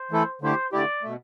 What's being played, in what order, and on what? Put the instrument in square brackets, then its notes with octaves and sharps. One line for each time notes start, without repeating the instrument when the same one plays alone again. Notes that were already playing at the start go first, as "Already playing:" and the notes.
Already playing: [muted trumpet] C5
[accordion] E3 A3 E4 A4
[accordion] D3 A3 E4 G4 [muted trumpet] C5
[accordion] D3 A3 E4 G4 [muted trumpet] D5
[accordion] B2 A3